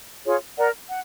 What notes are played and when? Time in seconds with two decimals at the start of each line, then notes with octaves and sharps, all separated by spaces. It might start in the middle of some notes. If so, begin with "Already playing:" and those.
0.25 F4 G#4 C#5
0.57 A#4 D5 F#5 A#5
0.89 F#5